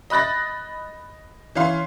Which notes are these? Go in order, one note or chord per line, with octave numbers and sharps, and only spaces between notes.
D#5 B5 F#6 A6 A#6
E3 C#4 F5 C6